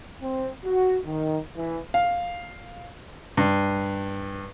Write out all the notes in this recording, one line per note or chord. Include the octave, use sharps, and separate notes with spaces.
C4
F#4
D#3
E3
F5
G2